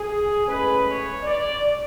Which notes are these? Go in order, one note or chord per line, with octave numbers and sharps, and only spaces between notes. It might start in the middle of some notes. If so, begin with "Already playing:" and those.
Already playing: G#4
A2 G#3 C#4 B4
C#5
D5